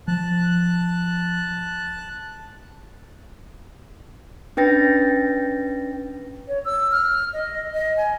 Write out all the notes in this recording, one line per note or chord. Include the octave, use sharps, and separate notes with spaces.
F3 A5 F#6
C#4 D4 B4 G5 A6 A#6
C#5
E6
F6
D#5
D#5
G#5